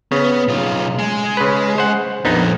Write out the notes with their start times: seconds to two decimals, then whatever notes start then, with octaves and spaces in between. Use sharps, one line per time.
0.12 C#3 B3
0.48 B1 F4
0.99 G#3
1.37 C#3 B4
1.78 C5 F#5
2.25 A#1 F2 A#2 B3 D#4